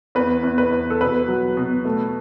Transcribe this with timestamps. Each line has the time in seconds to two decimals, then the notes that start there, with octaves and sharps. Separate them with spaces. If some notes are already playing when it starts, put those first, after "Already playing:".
0.15 E2 B4
0.43 E2
0.58 B4
0.73 E2
0.90 A4
1.01 B2 B4
1.28 F#3
1.57 B2
1.85 A3